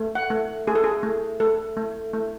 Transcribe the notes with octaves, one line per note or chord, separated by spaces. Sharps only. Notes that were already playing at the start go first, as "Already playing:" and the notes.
Already playing: A3
F#5
A3
A3 G#4
A4
G#4
A3
A3 A4
A3
A3